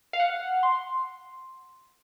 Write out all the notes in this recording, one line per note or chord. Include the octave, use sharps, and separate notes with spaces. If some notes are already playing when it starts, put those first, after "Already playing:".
F5
F#5
C6